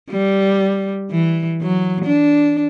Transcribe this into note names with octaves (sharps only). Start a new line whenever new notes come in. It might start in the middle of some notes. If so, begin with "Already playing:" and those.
G3
E3
F#3
D4